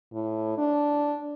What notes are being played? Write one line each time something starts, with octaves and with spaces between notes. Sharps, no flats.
A2
D4